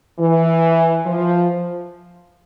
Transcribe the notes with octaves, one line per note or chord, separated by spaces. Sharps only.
E3
F3